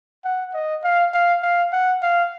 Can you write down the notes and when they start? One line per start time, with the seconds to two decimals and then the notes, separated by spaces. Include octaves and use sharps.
0.25 F#5
0.54 D#5
0.84 F5
1.14 F5
1.43 F5
1.73 F#5
2.02 F5